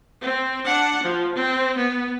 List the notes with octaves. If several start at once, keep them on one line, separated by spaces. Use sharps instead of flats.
C4
D4 F#5
F3
C4
B3